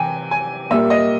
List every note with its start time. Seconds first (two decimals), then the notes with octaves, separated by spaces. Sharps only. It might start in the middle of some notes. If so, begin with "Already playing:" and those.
Already playing: C3 E3 G5 G#5
0.31 G#5
0.71 A#2 G3 A#3 E5
0.90 D#5